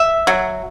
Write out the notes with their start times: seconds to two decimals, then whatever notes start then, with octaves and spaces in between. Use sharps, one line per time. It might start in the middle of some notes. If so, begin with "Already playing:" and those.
Already playing: E5
0.27 F#3